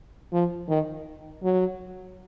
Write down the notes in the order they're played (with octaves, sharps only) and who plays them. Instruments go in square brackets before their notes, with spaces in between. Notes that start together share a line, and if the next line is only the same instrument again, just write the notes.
[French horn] F3
D#3
F#3